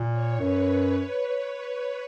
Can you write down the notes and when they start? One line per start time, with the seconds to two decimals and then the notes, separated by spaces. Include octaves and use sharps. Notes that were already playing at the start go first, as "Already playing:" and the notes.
Already playing: A#2
0.10 C#5
0.40 F#2 B4